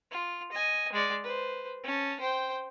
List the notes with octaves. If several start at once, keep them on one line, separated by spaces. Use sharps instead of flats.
F4
D#5 G#5
G#3 D5
B4 C5
C#4 A5
C5 G5